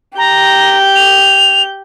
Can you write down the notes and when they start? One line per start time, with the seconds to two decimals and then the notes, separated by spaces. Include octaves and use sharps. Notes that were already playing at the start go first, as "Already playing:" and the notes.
0.18 G4 A#5 G6
0.96 F7